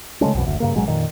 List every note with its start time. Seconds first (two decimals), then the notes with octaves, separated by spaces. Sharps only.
0.21 C#3 G#3 A3 C#4
0.35 B1 F2 B2 E3
0.47 F#1 D2
0.60 G2 C#3 A#3
0.75 A1 B2 F#3 G#3
0.88 F2 A#2 D#3